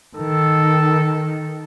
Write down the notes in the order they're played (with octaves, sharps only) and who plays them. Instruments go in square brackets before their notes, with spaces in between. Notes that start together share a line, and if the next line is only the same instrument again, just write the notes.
[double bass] D#3 [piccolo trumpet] A4